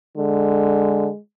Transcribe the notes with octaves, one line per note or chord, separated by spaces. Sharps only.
D3 G#3